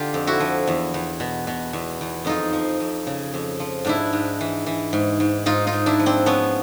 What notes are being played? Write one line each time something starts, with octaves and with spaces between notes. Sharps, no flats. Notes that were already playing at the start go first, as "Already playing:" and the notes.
Already playing: D3 F4 G4
F2
E4 F#4
F3
E2
E2
B2
B2
E2
E2
F2 D#4 F4
F3
F2
C#3
F2
F3
G#2 D4 E4
G#2
E3
E3
G#2
G#2
G#2 D#4 F4
D#4 F4
G#2
D4 E4
F3
C4 D4
F3 B3 C#4